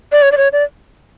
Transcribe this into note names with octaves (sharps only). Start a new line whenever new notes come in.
D5
C#5
D5
C#5
D5